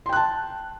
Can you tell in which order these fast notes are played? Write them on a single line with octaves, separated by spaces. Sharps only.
C6 G5 F#6 A5